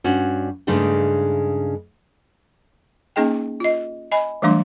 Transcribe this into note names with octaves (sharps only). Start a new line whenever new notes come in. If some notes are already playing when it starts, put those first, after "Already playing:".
G2 C#4 D4 F#4
G2 C#3 G#3 A3 D4 D#4
A#3 C#4 D#4 G#4 D#5 G5
F4 D#5
D#5 G#5 B5
E3 F#3 G3 A3 D4 C6